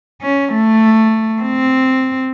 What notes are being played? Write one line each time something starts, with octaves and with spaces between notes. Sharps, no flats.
C#4
A3
C4